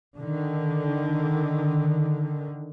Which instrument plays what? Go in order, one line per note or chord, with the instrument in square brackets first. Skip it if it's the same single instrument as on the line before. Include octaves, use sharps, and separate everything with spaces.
[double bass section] D3 D#3